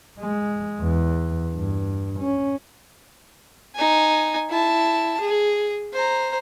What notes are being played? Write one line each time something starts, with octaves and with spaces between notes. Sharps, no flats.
G#3
E2
G2
C#4
D#4 G#5
E4 A5
G#4
C5 A#5